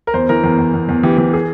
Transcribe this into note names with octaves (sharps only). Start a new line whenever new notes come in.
A#4
E2 C5
E3 A#4
E2
E2
E2
E2
E3 G4
E3
G#4